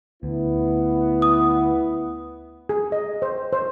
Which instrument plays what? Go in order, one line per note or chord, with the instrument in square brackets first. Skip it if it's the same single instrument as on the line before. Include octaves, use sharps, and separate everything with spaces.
[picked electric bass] D2 [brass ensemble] B3 E4
[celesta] D#6
[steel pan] G#4
D#5
C5
C5